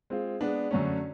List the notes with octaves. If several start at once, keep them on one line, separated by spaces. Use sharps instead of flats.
G#3 C4 F4
G#3 B3 D4
F#2 D3 F#3 A3 C#4